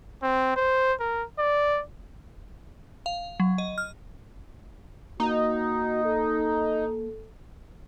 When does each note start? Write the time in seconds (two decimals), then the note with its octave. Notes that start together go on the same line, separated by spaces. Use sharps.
0.22 C4
0.56 C5
1.00 A#4
1.39 D5
3.06 F5
3.40 F#3
3.58 D#5
3.78 F6
5.20 A#3 D#4 F#4
6.05 A4